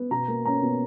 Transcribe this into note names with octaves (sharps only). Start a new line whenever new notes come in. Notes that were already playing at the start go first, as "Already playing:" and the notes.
Already playing: B3
B2 A#5
A#3
C#4 A#5
B2